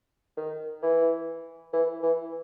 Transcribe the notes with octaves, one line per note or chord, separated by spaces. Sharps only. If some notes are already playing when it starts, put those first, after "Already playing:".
D#3
E3
E3
E3